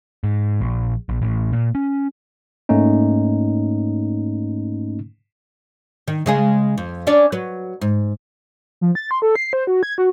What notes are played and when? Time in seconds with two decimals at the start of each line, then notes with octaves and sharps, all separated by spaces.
0.24 G#2
0.61 A#1
1.09 A#1
1.22 A1
1.52 A#2
1.75 C#4
2.69 G#2 A3 A#3 C#4 D#4
6.08 D#3
6.26 C#3 G#3 G#4
6.78 F2
7.07 C#4 D4 D5
7.32 F#3 B4
7.81 G#2
8.81 F3
8.95 A6
9.11 C6
9.22 A4
9.36 C7
9.53 C5
9.67 F#4
9.83 G#6
9.98 F#4